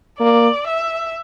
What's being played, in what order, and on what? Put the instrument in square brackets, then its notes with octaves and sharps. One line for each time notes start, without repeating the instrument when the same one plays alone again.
[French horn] A#3 [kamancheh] D5
[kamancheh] E5